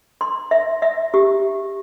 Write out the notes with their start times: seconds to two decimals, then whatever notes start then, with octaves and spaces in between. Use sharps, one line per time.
0.21 C6
0.51 E5
0.82 E5
1.14 G4